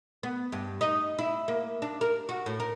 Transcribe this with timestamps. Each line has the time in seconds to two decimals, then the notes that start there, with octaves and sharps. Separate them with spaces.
0.23 B3
0.52 G2
0.81 D#4
1.18 E4
1.48 A#3
1.82 D4
2.01 A#4
2.29 F#4
2.46 A2
2.60 A#4